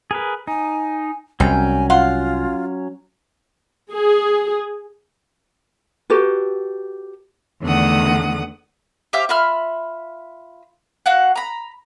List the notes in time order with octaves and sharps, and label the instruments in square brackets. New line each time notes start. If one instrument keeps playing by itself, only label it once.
[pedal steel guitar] G#4 A#4 B4
[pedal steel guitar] D#4 [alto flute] G#5
[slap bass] C2 [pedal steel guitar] F#3 C#4 [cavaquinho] G5 [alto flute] G#5
[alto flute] F4 [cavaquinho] F5 F#5 C6
[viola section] G#4
[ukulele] F#4 G4 A4 B4
[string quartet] E2 D3 D#3 A3 F#5 D#6
[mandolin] G4 C5 E5 F5
F4 E5 B5 F6
F#4 F5 F#5
A#5 B5